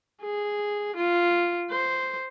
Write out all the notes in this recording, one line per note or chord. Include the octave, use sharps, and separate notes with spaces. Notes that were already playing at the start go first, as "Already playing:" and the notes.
G#4
F4
C5